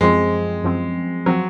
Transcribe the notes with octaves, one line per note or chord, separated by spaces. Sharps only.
F#2 F3 G#3 C4
F#2 F3 C4
F3 F#3 C4